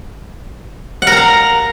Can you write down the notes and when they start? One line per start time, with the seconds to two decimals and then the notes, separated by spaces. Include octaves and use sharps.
1.02 F#5
1.07 A#4
1.12 A#5
1.17 F5